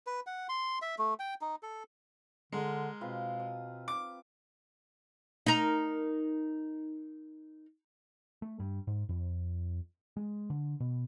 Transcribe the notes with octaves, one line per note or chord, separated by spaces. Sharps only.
B4
F#5
C6
E5
A3
G5
D#4
A4
D3 G#3 A#4
B2 C4 F4 B4
D#6
D6
D#4 A#4
A3
G2
G#2
F2
G#3
D3
B2